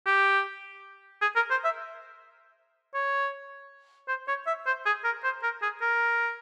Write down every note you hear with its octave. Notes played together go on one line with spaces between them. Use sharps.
G4
G#4
A#4
C5
E5
C#5
C5
C#5
E5
C5
G#4
A#4
C5
A#4
G#4
A#4